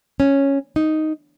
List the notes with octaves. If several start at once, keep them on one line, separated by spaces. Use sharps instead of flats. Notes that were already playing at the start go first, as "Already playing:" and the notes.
C#4
D#4